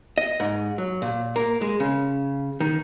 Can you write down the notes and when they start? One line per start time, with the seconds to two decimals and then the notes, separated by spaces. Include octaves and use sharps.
0.18 D#5
0.40 G#2
0.78 F#3
1.02 A#2
1.36 A#3
1.61 G#3
1.80 C#3
2.60 D#3